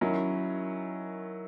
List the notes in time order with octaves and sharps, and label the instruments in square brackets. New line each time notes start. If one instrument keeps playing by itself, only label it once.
[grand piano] D#3 F#3 C#4 E4